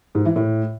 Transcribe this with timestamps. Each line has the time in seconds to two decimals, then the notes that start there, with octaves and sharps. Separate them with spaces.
0.15 G#2
0.25 E3
0.36 A2